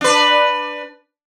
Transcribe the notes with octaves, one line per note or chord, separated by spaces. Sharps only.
D4 B4